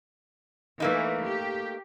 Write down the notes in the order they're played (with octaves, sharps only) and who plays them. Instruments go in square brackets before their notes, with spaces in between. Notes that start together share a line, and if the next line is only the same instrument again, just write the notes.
[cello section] E3 [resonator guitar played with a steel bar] A3 A#3 D#4
[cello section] G4